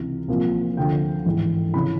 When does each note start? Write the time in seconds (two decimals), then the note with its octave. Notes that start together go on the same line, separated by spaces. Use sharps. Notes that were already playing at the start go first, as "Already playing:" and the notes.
Already playing: C#2 C3 E3
0.28 C2 A#2 F3
0.77 D2 D3 F3 G5
1.25 A1 G#2 E3
1.73 C#3 E3 B5